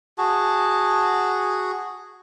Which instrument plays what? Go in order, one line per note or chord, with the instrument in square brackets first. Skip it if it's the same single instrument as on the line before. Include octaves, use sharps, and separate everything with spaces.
[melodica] F#4 G#4 [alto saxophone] A5